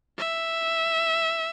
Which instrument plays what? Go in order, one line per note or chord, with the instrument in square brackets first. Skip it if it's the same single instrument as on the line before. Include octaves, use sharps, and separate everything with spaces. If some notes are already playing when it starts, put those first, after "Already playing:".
[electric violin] E5